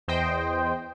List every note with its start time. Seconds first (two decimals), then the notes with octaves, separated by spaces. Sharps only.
0.08 E2 C5 D#5 G5